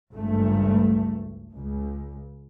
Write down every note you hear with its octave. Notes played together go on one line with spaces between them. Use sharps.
G#1 C#2 G2 A3
C#2